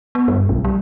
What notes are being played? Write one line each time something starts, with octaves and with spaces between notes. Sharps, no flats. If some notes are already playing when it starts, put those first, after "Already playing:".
B3
G2
B1
G3